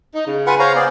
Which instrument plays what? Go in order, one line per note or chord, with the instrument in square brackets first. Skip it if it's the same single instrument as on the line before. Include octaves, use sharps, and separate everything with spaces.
[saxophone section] D#4
C#3
[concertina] F4 B4 F#5 [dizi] G#5
[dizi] C5 [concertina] C#5 F5 A#5
[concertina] B3 G#4 D5